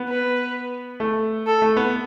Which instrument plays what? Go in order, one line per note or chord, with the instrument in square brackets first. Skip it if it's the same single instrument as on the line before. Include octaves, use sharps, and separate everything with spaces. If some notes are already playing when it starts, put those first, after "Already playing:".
Already playing: [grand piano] B3
[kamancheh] B4
[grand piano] A3
[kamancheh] A4
[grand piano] A3
B3